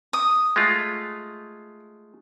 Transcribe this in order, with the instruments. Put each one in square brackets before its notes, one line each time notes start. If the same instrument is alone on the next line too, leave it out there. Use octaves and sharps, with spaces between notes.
[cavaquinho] D#6
[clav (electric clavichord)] G#3 A3 F4